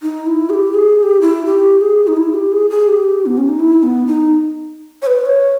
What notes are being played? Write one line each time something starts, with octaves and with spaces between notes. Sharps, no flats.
D#4
E4
G#4
G4
G#4
G#4
G4
E4
G4
G#4
D#4
E4
G4
G#4
G#4
G4
B3
C#4
D#4
E4
B3
D#4
C#5
B4
C#5